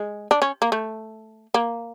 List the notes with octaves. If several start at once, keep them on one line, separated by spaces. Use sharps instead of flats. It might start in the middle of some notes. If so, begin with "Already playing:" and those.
Already playing: G#3
D4
C#4
A#3
A3
A#3